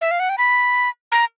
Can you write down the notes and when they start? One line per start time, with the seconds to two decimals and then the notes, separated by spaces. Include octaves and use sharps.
0.01 E5
0.11 F5
0.20 F#5
0.29 G5
0.38 B5
1.12 A#5